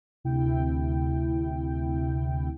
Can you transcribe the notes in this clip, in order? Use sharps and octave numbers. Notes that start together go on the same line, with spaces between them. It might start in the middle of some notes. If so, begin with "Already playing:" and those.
D2 C3 E4 G5